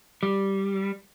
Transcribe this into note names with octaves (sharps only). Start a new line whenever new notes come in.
G3